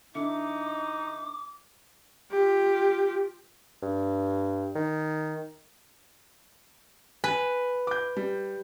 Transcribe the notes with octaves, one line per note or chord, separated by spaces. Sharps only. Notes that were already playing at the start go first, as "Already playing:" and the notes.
D3 D#4 E4 D6 C#7
F4 G4
G2
D#3
B4 G#5
D6 G6
G3